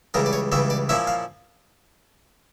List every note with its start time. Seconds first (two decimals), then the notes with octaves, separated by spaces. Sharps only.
0.14 C#2 C#3 E3 G3 A#4
0.26 D5
0.33 C#5
0.52 C#2 C#3 E3 G3 E5
0.70 D5
0.89 A#2 F3 C#4 E4 E5
1.07 F5